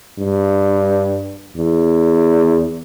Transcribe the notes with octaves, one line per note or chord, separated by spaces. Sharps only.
G2
E2